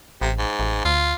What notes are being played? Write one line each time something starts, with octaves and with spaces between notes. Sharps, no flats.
A1 C3
G#2
A1
D2 F4